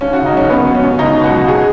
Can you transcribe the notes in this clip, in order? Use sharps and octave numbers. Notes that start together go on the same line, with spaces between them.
D#2 C#4
F#4
C#3
D#4
F#3 C#4
F#2 B3
F#3
C#4
F#2
C#2 D#4
B2
F#4
F#3
G#4